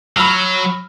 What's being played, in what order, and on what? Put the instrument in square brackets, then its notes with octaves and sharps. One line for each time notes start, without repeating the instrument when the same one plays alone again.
[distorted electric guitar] F#3 [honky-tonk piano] B5 E6 F6